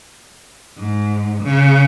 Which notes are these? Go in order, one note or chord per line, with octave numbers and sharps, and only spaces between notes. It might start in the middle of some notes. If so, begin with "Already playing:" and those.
G#2
C#3